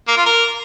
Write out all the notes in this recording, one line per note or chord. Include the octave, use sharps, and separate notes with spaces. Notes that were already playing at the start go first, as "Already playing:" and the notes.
A#3
F4
A#4